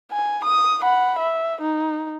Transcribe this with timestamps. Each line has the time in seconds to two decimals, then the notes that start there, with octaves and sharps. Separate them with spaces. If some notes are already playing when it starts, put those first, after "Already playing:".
0.11 G#5
0.44 D#6
0.82 F#5 B5
1.19 E5
1.61 D#4